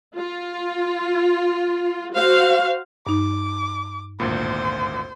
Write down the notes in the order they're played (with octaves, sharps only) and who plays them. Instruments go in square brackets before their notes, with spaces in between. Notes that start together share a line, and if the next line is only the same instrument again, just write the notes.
[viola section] F4
F#4 C5 F5
[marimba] G2 D#4 [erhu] D6
[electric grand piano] G#1 D2 A#2 [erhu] C5